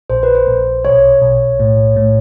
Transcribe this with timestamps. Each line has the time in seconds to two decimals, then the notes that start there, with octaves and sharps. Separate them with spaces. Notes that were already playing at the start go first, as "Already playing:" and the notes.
0.10 A#1 C5
0.23 B4
0.35 C5
0.47 A#1
0.85 B1 C#5
1.22 B1
1.60 A2
1.96 A2